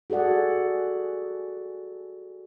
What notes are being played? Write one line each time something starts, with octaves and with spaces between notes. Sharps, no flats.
F#4 G#4 A4 D5 F#5